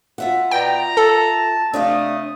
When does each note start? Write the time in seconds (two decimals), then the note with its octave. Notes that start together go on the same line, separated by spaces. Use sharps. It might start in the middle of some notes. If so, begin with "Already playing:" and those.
0.18 F4 E5 F#5
0.51 B2 D5 G5 A#5
0.97 A4 A5
1.74 C3 A3 D4 D#5 F5 D#6